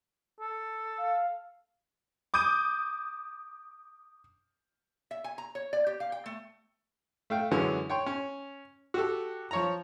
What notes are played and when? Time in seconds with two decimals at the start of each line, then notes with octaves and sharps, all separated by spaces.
0.40 A4
0.98 F5
2.34 D6 D#6 G6 D#7
5.11 E5
5.24 G#5
5.38 A#5
5.55 C#5
5.73 D5
5.87 G4
6.00 F5
6.12 G5
6.26 A3
7.30 A3 F5 G5
7.51 F#2 D3 E3 G#3 C#4
7.90 C#5 G5 C6
8.06 C#4
8.94 F#4 G4 A4
9.51 F3 C#5 A#5